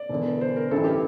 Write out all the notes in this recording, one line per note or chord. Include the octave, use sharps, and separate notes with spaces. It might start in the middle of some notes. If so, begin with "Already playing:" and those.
Already playing: D5
E1 E2 D3
C5
A#4
A1 G2 E3 A4
G4